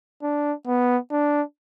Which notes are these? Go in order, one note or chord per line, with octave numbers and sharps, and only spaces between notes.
D4
B3
D4